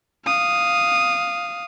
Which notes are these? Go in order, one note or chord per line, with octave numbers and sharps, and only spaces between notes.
F5 D#6